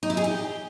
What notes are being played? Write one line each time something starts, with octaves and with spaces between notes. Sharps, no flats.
D#4
E4
G#4
G4